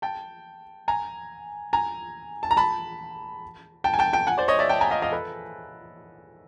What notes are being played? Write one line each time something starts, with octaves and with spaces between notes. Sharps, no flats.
G5 A5
G#5 A#5
G#5 A#5
A5
A#5
A5 B5
G5 A5
G#5
G5 A5
G5 A5
F#5 G#5
C5 D5
C#5 D#5
D5 E5
G5 A5
G#5 A#5
D#5 F5
D#5 F5
A4 B4